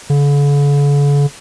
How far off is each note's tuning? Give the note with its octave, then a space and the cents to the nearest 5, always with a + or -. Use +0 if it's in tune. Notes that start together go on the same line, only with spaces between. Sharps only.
D3 -45